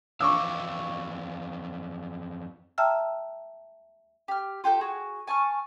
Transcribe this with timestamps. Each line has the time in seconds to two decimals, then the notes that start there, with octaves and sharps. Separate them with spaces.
0.20 F2 E3 F5 C#6 D6 E6
2.78 E5 G5 A5 A#5 E6 F6
4.28 G4 F6
4.64 F4 G4 A4 G6
4.81 F#4 G#4
5.27 G#5 A5 C#6 F6